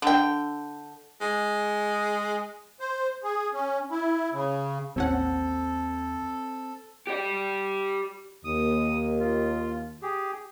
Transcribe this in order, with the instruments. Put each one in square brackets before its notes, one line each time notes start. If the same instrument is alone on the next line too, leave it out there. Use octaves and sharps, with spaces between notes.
[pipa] D3 G5
[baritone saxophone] G#3
[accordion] C5
G#4
C#4
E4
C#3
[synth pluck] A1 C#4 F#5 [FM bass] D#2 [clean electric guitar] C4 [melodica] A4
[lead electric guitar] G4 D5
[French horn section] D#2 [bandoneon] D#6
[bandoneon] F4
G4 G#4